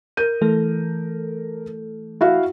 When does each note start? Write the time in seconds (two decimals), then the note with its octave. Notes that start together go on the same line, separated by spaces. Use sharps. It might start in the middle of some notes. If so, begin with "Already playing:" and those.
0.17 A#4 G6 D#7
0.41 E3 A3 A4
2.21 E4 F#4 F5